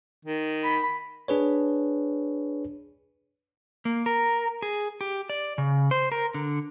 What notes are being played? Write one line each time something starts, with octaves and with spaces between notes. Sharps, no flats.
D#3
B5
D4 G#4 B4 C#5
A#3
A#4
G#4
G4
D5
C#3
C5
A#4
D3